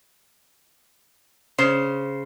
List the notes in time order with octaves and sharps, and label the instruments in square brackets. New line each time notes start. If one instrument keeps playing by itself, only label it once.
[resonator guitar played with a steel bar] C#3 C5